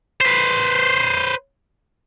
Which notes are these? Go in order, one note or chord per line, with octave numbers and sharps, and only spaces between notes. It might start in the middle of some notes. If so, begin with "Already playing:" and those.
B4 C5